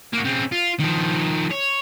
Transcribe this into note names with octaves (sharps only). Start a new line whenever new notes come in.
A#3 F#4
C#3 C4
F4
D#3 F3
C#5